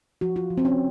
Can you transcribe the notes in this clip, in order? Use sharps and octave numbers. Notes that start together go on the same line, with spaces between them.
F3 F#4
F4
F3
C4
C#4